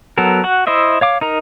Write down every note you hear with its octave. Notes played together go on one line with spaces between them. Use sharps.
F#3 B3 A4 A#4
F#4 F#5
E4 C5 D#5 E5
C#5 F5 D6
D#4 A#4 A#5